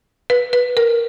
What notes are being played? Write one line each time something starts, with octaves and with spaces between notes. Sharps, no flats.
B4
B4
A#4